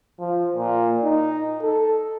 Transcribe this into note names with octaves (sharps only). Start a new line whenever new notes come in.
F3
A#2
D#4
A4